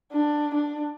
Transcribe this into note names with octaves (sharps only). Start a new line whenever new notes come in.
D4
D4